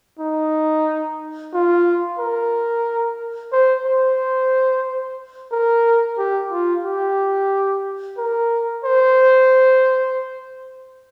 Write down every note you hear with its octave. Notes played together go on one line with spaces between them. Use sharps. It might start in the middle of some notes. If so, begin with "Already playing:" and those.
D#4
F4
A#4
C5
C5
A#4
G4
F4
G4
A#4
C5